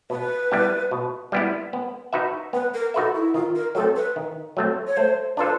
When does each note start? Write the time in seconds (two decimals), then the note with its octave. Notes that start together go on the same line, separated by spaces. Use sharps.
0.10 B2 B4
0.51 G3 B3 E4
0.91 B2
1.32 G3 B3 E4
1.73 B3
2.13 D#4 F#4 B4 E5
2.53 B3 B4
2.74 A#4
2.94 D#4 F#4 A4 B4 E5
3.14 E4
3.34 D#3 F4
3.55 A#4
3.75 F#3 A4
3.78 A3 C4
3.96 B4
4.16 D#3
4.57 F#3 A3 C4
4.87 C#5
4.97 A3 C5
5.37 D4 F4 A4 B4 C5